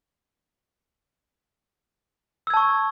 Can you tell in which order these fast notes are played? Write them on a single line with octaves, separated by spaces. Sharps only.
E6 G#6 A5 C#6